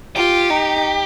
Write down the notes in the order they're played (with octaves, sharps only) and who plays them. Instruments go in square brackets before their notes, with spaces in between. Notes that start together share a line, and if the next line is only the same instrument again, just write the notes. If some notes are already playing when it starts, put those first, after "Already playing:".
[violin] F4 [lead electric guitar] G4
[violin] D#4